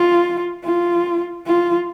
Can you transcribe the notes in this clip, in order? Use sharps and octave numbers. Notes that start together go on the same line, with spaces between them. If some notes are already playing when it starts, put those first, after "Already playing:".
Already playing: F4
F4
F4